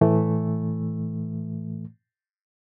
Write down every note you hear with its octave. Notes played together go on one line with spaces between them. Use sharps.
A2 E3 A3